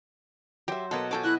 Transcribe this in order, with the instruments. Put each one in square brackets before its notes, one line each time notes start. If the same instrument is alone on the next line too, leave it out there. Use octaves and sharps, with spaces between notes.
[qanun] F#3 C5 [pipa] G4 E5
[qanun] B2 C#5 F#5 [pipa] A#3 B3 A4 [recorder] D#5
[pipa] F3 A4 C#5 [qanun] F#4 G#5 D6
[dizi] E4 [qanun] F#4 D#5 E5 [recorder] F#6